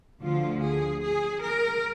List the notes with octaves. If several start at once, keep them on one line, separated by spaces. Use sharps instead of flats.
D2 D3 F3 F4
G#4
G#4
A#4